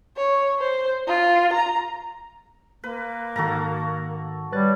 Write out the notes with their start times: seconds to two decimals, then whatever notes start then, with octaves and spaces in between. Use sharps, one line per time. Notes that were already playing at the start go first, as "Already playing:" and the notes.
0.17 C#5
0.59 C5
1.08 F4
1.53 A#5
2.84 A#3 B4
3.36 G#2 D#3 F#4 A4 A#5
4.52 G3 B4 C#5 F#6 A6